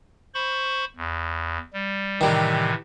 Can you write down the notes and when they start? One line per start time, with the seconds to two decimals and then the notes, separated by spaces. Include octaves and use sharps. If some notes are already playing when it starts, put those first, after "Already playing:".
0.34 C5 B5 C#6
0.97 E2
1.73 G3
2.21 A2 C3 D#3 E3 G3